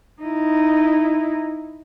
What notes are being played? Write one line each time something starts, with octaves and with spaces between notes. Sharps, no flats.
D#4 E4